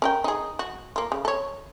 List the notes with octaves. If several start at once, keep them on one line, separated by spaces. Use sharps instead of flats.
C#4 A#4 G5
D#4 G#4
F#4
A#3 F4
C#3
A4 C#5